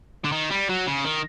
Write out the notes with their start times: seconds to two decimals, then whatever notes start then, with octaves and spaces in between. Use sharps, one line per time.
0.24 D3
0.32 D#3
0.50 G3
0.69 F#3
0.87 C#3
1.04 D#3